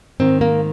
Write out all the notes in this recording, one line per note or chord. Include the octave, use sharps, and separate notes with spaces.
G#2 D#3 C4
A#3